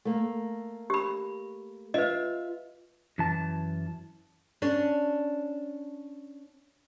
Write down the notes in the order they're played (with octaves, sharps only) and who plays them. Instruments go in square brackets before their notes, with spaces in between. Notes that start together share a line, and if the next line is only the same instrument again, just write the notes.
[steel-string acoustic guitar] A3 A#3
[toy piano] G4 B5
[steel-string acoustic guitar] F4 E5 [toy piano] B4 D#5
[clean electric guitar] F#2 E3 A5
[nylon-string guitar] C#4 D4